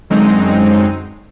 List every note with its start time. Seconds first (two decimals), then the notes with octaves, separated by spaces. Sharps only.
0.10 F#2 D3 F#3 G#3 C4 D#4